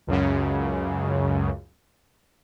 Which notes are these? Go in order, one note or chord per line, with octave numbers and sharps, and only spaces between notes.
C#2 F#2 C#3